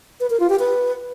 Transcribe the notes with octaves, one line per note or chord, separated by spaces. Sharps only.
B4
A#4
F4
G4
B4